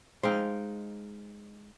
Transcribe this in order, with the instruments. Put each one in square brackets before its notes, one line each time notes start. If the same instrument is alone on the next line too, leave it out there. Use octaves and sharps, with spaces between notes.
[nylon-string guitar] G#3 D#4 [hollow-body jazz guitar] C5 F5 G5